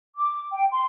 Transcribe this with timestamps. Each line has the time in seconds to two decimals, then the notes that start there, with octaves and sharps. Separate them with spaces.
0.17 D6
0.51 G5
0.72 C6